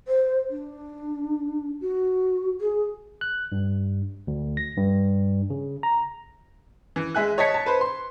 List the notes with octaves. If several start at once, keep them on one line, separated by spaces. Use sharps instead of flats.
C5
D4
F#4
G#4
F#6
G2
D2
A#6
G2
C#3
A#5
E3
G#3 E5 G#5 F#6
C#5 D#5 A5 G#6 B6 C#7
A5
B4 C5
C6